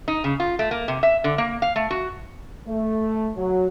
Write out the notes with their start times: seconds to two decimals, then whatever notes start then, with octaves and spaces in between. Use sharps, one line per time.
0.08 D#4
0.24 C#3
0.40 F4
0.59 A3
0.71 A#3
0.88 C3
1.03 E5
1.24 D3
1.38 A#3
1.62 F5
1.76 A3
1.91 F#4
2.68 A3
3.37 F#3